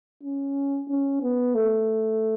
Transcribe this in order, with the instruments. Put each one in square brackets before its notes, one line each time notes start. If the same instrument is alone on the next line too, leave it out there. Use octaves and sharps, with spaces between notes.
[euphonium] C#4
C#4
B3
A3